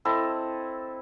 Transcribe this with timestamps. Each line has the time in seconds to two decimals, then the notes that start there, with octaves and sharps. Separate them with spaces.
0.05 C4 E4 A4 D#5